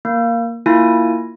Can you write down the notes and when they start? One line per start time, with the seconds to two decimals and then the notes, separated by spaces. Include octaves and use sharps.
0.05 A#3
0.66 A#3 E4 F4 G#5 A#6